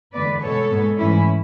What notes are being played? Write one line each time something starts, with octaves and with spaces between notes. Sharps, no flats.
E2 D3 G#3 B3 B4 D5
B2 G#3 B3 A4 C#5
G#2 G#3 B3
G#2 E3 A3 C#4 E4